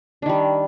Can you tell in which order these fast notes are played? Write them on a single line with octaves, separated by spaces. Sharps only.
D4 D#3 G3